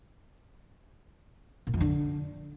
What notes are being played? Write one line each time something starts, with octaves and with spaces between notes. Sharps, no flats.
A#2
F2
D3